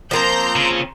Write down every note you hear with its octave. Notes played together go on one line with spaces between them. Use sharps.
F3 A#3 C4 A#5 C6 G6
C#3